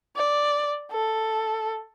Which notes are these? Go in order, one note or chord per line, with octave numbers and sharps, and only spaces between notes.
D5
A4